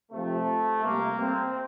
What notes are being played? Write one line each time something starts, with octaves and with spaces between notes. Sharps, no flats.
C3 F3 A3
C3 G3 A#3
C4